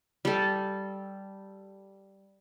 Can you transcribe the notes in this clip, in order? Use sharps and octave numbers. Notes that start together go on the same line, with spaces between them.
G3 A4